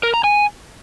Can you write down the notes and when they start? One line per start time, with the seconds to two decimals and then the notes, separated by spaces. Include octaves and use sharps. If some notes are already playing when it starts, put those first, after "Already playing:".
0.03 A#4
0.14 A#5
0.24 G#5